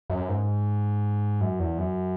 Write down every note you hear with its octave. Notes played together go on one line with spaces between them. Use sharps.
F#2
G#2
F#2
E2
F#2